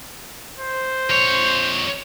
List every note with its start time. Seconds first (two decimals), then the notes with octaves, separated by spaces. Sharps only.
0.59 C5
1.10 F2 C#5